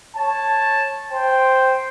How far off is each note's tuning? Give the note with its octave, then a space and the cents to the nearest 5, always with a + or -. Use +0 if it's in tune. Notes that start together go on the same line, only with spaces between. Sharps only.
C#5 -15 A5 +0
C5 +0 G5 +0